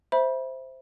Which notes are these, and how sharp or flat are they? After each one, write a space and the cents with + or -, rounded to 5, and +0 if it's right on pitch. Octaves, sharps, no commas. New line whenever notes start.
C5 +0 E5 -5 B5 -30